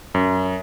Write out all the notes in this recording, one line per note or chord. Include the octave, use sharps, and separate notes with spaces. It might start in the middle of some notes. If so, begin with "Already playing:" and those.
F#2